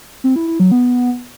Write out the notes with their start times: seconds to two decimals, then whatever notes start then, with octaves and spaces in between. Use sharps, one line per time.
0.24 C4
0.36 E4
0.48 E4
0.60 F#3
0.72 B3